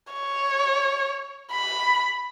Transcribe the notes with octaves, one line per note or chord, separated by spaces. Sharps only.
C#5
B5